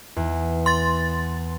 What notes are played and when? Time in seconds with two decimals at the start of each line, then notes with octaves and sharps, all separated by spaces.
0.16 E2
0.66 C6 A6